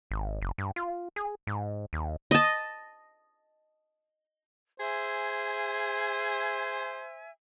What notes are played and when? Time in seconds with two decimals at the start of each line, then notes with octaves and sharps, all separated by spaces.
0.11 G#1
0.42 F#1
0.58 G2
0.76 F4
1.16 G#4
1.47 G#2
1.93 D#2
2.31 D#5 A5
4.80 G#4 C5 E5 G#5